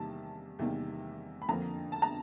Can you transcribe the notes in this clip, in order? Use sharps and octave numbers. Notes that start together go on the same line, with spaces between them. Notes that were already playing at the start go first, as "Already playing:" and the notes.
Already playing: E2 C3 D#3 G3 A#3 A5
E2 C3 D#3 G3 A#3
B5
F2 D3 F3 A#3 A#5
A5
A#5